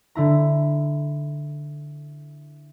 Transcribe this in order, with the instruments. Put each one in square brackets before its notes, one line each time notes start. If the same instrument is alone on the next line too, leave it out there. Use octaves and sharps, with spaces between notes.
[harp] D3 E4 A#5